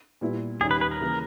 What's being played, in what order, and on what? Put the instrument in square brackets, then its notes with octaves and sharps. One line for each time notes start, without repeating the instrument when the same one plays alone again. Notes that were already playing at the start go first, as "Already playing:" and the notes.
[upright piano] A#2 G3 B3 E4
[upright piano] D#2 D#3 G3 C#4 [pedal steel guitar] G#4
[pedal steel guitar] B4
B4
A#4
[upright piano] C#3 E3 A#3